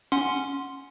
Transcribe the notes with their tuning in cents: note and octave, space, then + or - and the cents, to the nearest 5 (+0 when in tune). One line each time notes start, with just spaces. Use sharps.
C#4 +0 F#5 +0 C6 +0